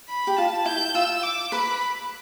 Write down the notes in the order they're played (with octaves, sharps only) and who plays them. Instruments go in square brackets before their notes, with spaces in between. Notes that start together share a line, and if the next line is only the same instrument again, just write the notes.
[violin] B5
[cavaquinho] G4
[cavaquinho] F4 [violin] A5
[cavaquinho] E4 [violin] G6
[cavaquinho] F4 [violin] E6
[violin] D6
[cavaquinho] B4 [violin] B5